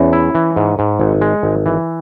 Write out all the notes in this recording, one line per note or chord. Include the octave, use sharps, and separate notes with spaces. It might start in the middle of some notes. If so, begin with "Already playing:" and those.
Already playing: E2 C#4
E4
E3
G#2
G#2
G#1
G#3
G#1
E3